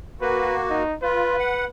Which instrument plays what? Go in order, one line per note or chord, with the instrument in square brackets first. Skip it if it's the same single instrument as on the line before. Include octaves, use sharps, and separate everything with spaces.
[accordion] A#3 F#4 [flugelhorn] B4
[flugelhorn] D#4
[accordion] F4 [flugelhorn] B4
[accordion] F#5